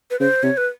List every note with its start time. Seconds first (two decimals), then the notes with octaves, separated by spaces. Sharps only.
0.11 B4
0.20 C#3 C5
0.43 C3 C#5
0.57 B4